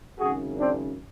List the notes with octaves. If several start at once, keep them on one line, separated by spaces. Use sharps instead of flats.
G#1 F#2 C#3 F#4 G#4
C4 D4